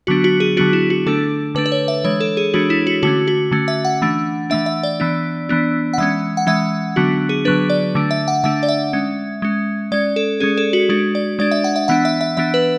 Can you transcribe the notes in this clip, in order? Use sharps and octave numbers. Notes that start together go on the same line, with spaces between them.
D3 F#3 B3 D4 F#4
F#4
G#4
D3 F#3 B3 D4 F#4
E4
F#4
D3 A3 D4 A4
D3 A3 D4 B4
B4
C#5
E5
E3 G#3 D4 C#5
A4
G#4
E3 G#3 D4 F#4
E4
F#4
D3 A3 C#4 F#4
F#4
D3 A3 C#4
E5
F#5
E3 A3 D4
E3 A3 D4 E5
E5
D5
E3 B3 D4
E3 B3 D4
F#5
E3 G#3 C#4 E5
F#5
E3 G#3 C#4 E5
D3 F#3 B3 D4 F#4
G#4
D3 F#3 B3 D4 B4
D5
D3 A3 D4
E5
F#5
D3 A3 D4 E5
D5
E5
G#3 C#4
G#3 C#4
G#3 C#4 D5
A4
G#3 C#4 G#4
A4
F#4
G#3 D4 F#4
D5
G#3 D4 D5
E5
F#5
E5
E3 B3 D4 F#5
E5
E5
E3 B3 D4 E5
B4